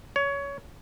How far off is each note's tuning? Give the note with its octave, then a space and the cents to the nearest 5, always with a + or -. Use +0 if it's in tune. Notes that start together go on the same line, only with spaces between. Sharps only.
C#5 +20